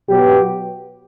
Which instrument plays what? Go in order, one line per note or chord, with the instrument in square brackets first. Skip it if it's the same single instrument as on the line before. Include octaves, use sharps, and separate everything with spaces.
[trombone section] B2 F#3 B3 G4